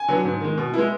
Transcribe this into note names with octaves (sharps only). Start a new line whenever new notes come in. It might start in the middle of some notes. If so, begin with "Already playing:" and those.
Already playing: G#5
D3 F#3 B3
G#2
D#3 G#3
B2
G#3 B3 E4